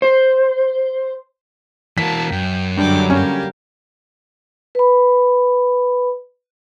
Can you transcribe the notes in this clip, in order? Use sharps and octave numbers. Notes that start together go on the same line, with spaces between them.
C5
E3 A#3 F#4 A5 B6
F#2 G5
G2 D3 F#3 G3 G5 D6
A#3 C#4 G4
B4 B5